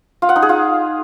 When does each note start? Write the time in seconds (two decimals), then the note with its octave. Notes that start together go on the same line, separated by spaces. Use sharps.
0.22 F4
0.29 F#5
0.36 D#4
0.42 G#4
0.49 F4